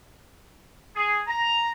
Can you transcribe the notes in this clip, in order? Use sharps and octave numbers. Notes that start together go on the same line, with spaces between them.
G#4
A#5